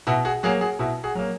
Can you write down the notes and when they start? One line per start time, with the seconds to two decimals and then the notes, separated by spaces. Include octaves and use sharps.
0.07 B2 E4 F#4
0.25 F#4 G#4
0.43 F#3 A#3 F#4 G#4
0.61 F#4 G#4
0.79 B2 E4 F#4
1.04 F#4 G#4
1.15 F#3 A#3